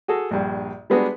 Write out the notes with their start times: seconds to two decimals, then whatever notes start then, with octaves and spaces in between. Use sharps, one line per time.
0.08 F#4 G#4 A4
0.31 A#1 G2
0.90 G3 G#3 B3 D4 F#4 G#4